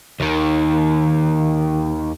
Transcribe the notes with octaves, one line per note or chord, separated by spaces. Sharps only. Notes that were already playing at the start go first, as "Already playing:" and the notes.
D#2 D#3